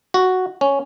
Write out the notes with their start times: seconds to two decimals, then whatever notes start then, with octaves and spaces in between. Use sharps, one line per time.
0.14 F#4
0.61 C#4